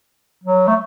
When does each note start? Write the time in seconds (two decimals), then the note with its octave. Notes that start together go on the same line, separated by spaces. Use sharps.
0.43 F#3
0.67 A3